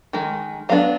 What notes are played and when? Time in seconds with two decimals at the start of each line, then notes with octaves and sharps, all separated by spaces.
0.13 D#3 G#3
0.69 F#3 B3 D4 F5